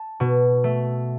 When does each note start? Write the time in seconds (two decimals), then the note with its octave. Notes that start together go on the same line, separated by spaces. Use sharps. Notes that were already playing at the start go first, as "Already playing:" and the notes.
Already playing: A5
0.20 B2
0.64 A3